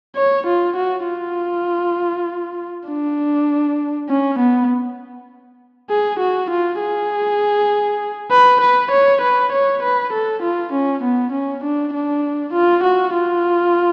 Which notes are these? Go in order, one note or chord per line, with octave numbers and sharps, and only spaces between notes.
C#5
F4
F#4
F4
D4
C#4
B3
G#4
F#4
F4
G#4
B4
B4
C#5
B4
C#5
B4
A4
F4
C#4
B3
C#4
D4
D4
F4
F#4
F4